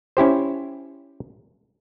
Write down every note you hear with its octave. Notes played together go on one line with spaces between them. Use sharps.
C#4 E4 G4 C5